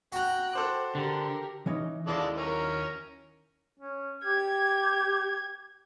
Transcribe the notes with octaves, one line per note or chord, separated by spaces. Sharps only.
F#4 G5 A#5 F#6
A4 C5 D6
D3 G4 A#4
E3 C#4 D#4
D#2 G#3 E4 A4 D5 F5
C#4 A#4
C#4
G4 G#6